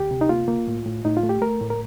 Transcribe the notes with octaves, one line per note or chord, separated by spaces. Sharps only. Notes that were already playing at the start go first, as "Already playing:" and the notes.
Already playing: D2 G4
C3
D#4
A#3 F4
A#3
A2
A2
A2 D#4
F4
A3
G4
A3 A#4
A2
A#4